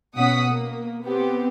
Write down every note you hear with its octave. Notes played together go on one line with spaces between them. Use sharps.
B2 C#4 F#5 D#6 B6
A#3
B3 C4 G4